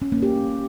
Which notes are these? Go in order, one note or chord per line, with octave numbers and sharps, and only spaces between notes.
C#4
A#3
G4